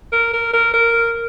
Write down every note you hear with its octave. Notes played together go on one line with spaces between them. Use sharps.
A#4
A#4
A#4
A#4